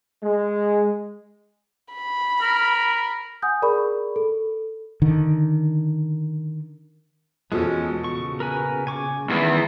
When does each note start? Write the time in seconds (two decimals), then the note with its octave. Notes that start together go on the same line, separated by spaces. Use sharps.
0.23 G#3
1.93 B5
2.42 A#4
3.42 F#5 G#5 D#6 G6
3.62 G#4 A#4 D5 B5 C#6
4.16 A4
5.02 D3 D#3
7.52 E2 B2 F3 G#3 C#4 A4
8.04 A#2 C#3 C#6
8.40 A#4 B4 G#5
8.87 G#5 C#6 D6
9.30 E2 D#3 G#3 C#4